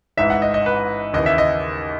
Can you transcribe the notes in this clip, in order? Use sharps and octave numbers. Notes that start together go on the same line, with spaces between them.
A1 G#2 E3 E5
F#5
D#5
D#5
B4
D#2 C#3 E3 D#5
E5
D#5